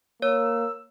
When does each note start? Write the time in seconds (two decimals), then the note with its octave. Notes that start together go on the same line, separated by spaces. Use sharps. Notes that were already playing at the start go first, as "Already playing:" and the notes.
0.22 A#3 C#5 E6